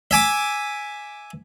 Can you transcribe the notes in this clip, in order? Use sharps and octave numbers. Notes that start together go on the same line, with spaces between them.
E5 G#5 D6